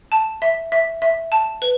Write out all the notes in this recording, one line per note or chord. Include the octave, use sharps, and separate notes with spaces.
A5
E5
E5
E5
A5
B4